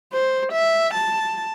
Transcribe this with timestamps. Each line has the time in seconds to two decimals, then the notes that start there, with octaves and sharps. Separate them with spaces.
0.13 C5
0.52 E5
0.94 A5